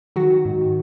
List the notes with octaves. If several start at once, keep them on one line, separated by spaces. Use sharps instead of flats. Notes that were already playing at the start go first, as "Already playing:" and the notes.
D#3 F#3 F#4
D#3
G#2
D#3